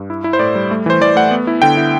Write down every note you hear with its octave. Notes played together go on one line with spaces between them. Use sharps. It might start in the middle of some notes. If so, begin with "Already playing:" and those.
Already playing: G2
E4
E4
C5
A2 D5
G3
A3
E3 C5
E3 D5
A3 F#5
B3
E4
D3 G5
E4